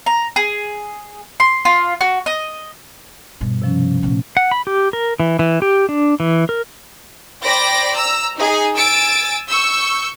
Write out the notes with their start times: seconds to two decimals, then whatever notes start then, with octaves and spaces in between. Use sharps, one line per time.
0.06 A#5
0.36 G#4
1.40 C6
1.65 F4
2.01 F#4
2.26 D#5
3.41 G2 B2
3.62 C3 F3 C#4
4.03 A#2 A3 B3 C#4
4.37 F#5
4.51 B5
4.67 G4
4.93 A#4
5.20 E3
5.39 E3
5.62 G4
5.89 D4
6.20 E3
6.49 A#4
7.43 C5 D5 G5 B5 A#6 D7
7.95 A#5 E6
8.38 D#4 G#4
8.75 G#5 E6 A6 D7
9.47 C#6 E6 G6